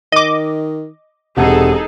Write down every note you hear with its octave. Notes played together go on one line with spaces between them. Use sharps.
D#3 D#5 D6
E1 C3 D#4 G#4 A4 F#5 A5